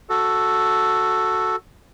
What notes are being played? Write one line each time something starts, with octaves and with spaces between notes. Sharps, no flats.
F#4 A4